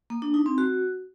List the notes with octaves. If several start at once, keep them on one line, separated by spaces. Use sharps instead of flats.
A#3
D4
D#4
C4
F#4